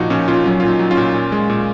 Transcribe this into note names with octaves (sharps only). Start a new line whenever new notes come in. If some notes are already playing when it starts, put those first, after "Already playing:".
Already playing: A#2 F3 D#4 F#4
A#2 C#4
A#2 C#4 F4
F#3 C#4
A#2 F4
D#4
F#3
C#4 F4
A#2
A#2
G#3
A#2